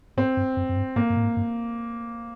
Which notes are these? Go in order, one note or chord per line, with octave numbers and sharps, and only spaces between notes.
G#2 C4
G2
F#2
F#2
G2
G#2 A#3
G2
A2
G#2
G2